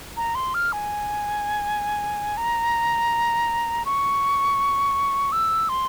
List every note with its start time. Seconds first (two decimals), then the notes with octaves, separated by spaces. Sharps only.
0.17 A#5
0.35 C6
0.54 F6
0.73 G#5
2.37 A#5
3.86 C#6
5.32 E6
5.69 C6